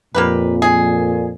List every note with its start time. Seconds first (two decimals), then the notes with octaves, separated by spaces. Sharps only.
0.15 F2 A#2 A#3 G4 B4
0.62 G#4